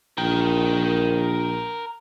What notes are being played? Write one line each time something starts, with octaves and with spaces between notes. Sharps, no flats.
A#1 A#4 G5